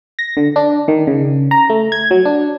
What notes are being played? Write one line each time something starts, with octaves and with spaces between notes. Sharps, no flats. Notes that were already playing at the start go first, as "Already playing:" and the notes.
A#6
D3
D4
D#3
C#3
A#5
A3
G#6
F#3
D4